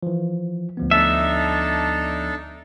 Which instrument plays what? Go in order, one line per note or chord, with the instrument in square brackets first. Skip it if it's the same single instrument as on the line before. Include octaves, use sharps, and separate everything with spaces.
[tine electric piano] E3 F3
D2 F3 B3
[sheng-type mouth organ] D4 D#4 A4 [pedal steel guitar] E5